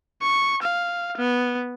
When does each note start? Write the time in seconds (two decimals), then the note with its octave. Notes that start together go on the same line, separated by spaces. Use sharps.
0.22 C#6
0.62 F5
1.17 B3